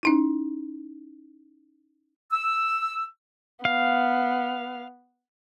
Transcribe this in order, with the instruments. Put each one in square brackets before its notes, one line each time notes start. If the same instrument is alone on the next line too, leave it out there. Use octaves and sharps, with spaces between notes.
[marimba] C#4 D#4 E4
[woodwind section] E6
[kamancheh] B3 [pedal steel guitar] F5